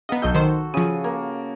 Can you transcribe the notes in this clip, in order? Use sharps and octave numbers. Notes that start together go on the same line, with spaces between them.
B3 D#5 F5 F#5 A#5
B1 F#4 A4 D#5 G6
D#3 C5
C#3 F3 D#7
A#3